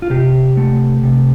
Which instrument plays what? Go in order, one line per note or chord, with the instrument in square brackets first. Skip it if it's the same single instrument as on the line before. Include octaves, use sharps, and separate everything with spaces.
[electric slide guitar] F4
C3 G4
A3
C3